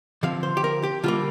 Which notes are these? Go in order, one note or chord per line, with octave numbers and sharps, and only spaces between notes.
D3 F3 C4 F5
C5
G4
A#4
G4
D3 G3 A#3 F4